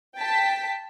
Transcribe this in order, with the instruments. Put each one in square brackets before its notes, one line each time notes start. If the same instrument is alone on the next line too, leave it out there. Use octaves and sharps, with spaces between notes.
[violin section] G5 A5 B6